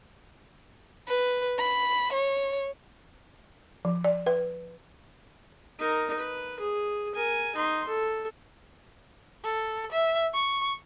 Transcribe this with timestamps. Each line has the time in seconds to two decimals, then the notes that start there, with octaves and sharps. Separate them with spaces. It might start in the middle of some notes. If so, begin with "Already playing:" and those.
1.08 B4
1.58 B5
2.13 C#5
3.85 F3
4.04 D5
4.27 B4
5.79 D#4 A#4
6.19 B4
6.59 G#4
7.15 A#4 G#5
7.55 D#4 C6
7.88 A4
9.44 A4
9.92 E5
10.34 C#6